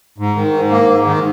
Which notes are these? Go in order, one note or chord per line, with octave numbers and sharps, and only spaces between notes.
G#2
D#3
G#2
A#3
G#2
D#3